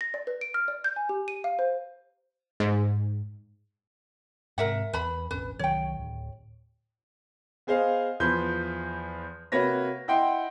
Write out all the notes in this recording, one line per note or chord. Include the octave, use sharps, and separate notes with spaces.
A#6
D5
B4
D7
F6
D5
G6
G#5
G4
D#7
F5
C5
G#2
G#2 C3 A#4 E5 F#5
E2 B4 B5
E1 A1 C#4 B4
C2 D#3 F#3 C#5 G5
D1
B3 G#4 C5 D#5 F5
E2 F3 B4 C6 G6
C3 A#3 F#4 B4 C#5 A#6
E4 D#5 F#5 G5 C6